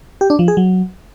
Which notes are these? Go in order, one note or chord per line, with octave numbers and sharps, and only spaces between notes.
G4
D4
F3
G#4
F#3